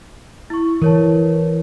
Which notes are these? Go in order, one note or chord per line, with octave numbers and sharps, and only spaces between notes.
E4 C#6
E3 A#4 C#5 A5